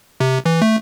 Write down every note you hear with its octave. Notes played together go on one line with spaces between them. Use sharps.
C3
E3
A3